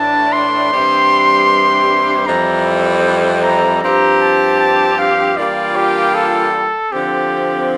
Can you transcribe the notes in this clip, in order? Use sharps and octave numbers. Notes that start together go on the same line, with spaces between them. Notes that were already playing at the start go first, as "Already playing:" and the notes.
Already playing: A2 E3 A3 D4 A5
C6
G2 E3 G3 C4 G4
F2 E3 G3 C4 E4 A#5
A#5
G2 F3 C4 G4 A#5
A5
A5
F5
E3 G3 A#3 D4 F4 D5
G4
A4
D3 F3 C4 G4